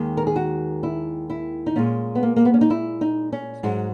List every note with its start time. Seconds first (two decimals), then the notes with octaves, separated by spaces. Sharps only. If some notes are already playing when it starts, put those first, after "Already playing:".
Already playing: D#2 D#3 G#3
0.17 A#4
0.27 G#4
0.36 F#4
0.83 E4
1.30 E4
1.66 D#4
1.76 A#2 G#3 C#4
2.15 B3
2.23 A#3
2.36 A#3
2.45 B3
2.54 C#4
2.61 D#4
2.70 E4
3.01 D#4
3.32 C#4
3.63 G#2 F#3 G#3